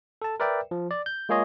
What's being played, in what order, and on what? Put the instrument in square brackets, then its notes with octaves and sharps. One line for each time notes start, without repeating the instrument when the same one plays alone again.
[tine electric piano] A4 A5
A#4 B4 D5 E5 G5
F3
D5
G6
G#3 A#3 F4 G#4 C#5 D#5